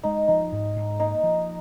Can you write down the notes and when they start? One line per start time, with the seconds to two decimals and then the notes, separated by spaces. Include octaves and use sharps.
0.03 G#3 D#4
0.28 F3 D#4
0.52 G#2
0.76 G#2
1.00 A#3 D#4
1.23 F3